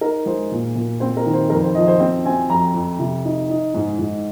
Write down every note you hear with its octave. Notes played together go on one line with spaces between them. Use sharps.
D#4 A#4
G#3 C5
A#2
A#2
C4 C5
A#4
D#3
C5
F2 A#4
C5
F3 D#5
C5
C4 C5
C4 G#5
F2 A#5
F2
C3
D#4
D#4
G#2
G#2